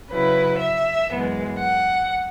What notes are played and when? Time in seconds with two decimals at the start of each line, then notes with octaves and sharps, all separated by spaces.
0.10 C#3 F#3 E4 B4
0.59 E5
1.09 F#2 E3 G#3 B3
1.57 F#5